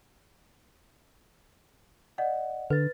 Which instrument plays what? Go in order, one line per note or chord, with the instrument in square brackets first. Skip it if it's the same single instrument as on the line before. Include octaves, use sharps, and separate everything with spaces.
[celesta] D5 D#5 F#5
[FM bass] D3 [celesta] B4 A6